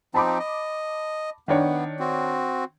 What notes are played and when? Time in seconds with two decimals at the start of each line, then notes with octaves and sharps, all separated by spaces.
0.14 F3 C4 D#4 A5 B5 D6
0.39 D#5
1.48 D#3 B3 D4 C#5
2.00 C4 F#4